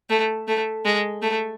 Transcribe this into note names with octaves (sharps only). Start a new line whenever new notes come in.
A3
A3
G#3
A3